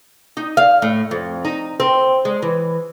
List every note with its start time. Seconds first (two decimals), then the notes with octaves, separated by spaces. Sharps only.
0.37 D#4
0.57 F5
0.82 A2
1.11 F2
1.45 D#4
1.80 C4
2.25 G#3
2.42 E3